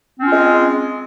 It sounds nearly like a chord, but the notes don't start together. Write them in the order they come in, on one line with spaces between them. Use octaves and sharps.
C4 C#4 F4 G#3